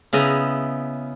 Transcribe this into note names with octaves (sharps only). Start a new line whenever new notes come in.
C#3 B3 E4 D#5 A#5